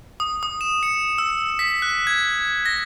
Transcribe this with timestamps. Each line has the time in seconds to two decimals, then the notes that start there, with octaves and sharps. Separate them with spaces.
0.20 D#6
0.43 D#6
0.61 E7
0.83 C#7
1.18 E6
1.59 B6
1.82 F#6
2.07 G#6
2.66 A#6